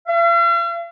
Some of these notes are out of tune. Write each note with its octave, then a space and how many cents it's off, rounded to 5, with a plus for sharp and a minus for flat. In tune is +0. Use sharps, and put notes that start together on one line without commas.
F5 -45